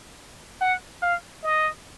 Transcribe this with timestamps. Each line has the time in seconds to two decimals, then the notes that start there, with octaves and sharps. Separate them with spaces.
0.61 F#5
1.02 F5
1.43 D#5